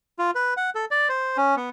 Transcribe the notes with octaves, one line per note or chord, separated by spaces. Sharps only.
F4
B4
F#5
A4
D5
C5
C#4
B3